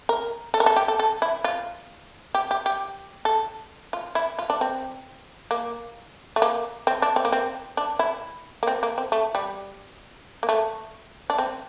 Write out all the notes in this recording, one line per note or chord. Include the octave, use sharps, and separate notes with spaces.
A#4
A4
A#4
A4
G4
A4
A4
E4
F4
G4
G4
G4
A4
F4
E4
F4
D4
C4
A#3
A3
A#3
C4
D4
C4
A#3
C4
D4
E4
A#3
C4
A#3
C4
A3
G3
A#3
A3
D4
C4